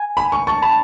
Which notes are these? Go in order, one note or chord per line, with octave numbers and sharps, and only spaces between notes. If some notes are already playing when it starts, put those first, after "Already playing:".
Already playing: G#5
B5
C#6
A5 C#6
A5 B5